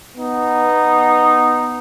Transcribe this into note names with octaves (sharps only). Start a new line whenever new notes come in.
B3 D#4